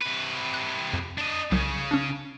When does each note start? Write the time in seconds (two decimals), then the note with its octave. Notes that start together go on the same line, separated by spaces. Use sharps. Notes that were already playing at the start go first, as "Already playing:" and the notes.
0.01 C3 B4
0.54 F#6
0.93 F2
1.18 D4 D#5
1.52 C2 C#3 F#3
1.91 C#4 D4